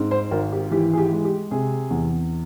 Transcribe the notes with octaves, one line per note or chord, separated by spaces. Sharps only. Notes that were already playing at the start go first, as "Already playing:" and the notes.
Already playing: G#2 C4
C5
G#1 A#4
G4
E3 G4
G#4
G4
G#3
G4
C3 G#4
E2